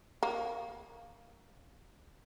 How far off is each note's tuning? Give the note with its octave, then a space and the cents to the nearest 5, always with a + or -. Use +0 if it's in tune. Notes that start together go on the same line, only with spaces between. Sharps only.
A#3 -5